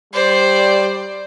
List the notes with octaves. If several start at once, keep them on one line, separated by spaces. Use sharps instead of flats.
G3 C5 D5